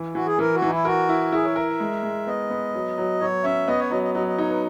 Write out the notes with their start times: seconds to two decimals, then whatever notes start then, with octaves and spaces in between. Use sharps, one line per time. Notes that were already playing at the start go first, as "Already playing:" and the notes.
Already playing: E3
0.14 E3 F#4
0.26 G#4
0.39 E3 A#4
0.54 F#4
0.62 E3 D#4
0.70 E4
0.85 F#4 A#4
1.09 E4
1.32 E4 G#4
1.44 C#5
1.56 A#4 E5
1.68 E5
1.80 G#3
2.03 G#3
2.27 B3 D#5
2.50 B3
2.74 F#3
2.98 F#3
3.21 F#3 C#5
3.44 C#4 E5
3.68 B3 D#5
3.79 C#5
3.91 F#3 D#5
4.03 D#5
4.14 F#3 D#5
4.27 D#5
4.38 D#4 C#5
4.50 B4